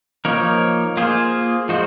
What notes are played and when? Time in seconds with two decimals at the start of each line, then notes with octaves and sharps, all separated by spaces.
0.25 F3 A#3 D#4 A#4 C#5
0.97 A#3 F4 G#4 C5
1.69 F3 G#3 D#4 F#4 C5